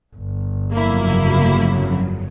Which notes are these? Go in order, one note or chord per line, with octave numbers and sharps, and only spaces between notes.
G1
F2 C#3 F#3 A#3 E4